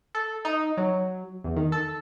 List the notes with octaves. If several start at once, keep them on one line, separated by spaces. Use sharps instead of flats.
A4
D#4
F#3
E2
D#3
A4